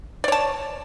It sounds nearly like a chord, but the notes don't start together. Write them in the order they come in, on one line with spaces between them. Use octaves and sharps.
D5 C#5 A5